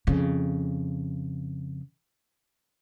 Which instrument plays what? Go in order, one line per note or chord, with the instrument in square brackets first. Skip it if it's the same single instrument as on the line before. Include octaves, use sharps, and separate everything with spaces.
[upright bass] F2 C#3